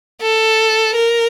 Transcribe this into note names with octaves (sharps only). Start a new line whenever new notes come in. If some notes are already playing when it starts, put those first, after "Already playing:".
A4
A#4